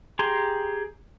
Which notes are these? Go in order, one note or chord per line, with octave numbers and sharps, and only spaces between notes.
G4 G#4 A#5 C6